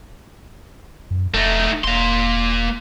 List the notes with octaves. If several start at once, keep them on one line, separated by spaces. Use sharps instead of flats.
F#2
E1 A3 D#4
E1 A#3 C6